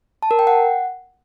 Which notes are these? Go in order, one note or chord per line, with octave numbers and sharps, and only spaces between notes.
A5
A#4
G5
F#5